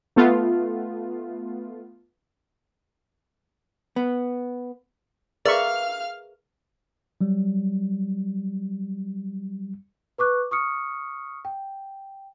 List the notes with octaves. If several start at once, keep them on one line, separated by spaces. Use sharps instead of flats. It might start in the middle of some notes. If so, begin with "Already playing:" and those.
A3 B3 F4
B3
G#4 A#4 B4 D5 E5 F5 C#6 F6
F#3 G3
B4 C#6 D6 F#6
C#6 D#6 F6 C#7
G5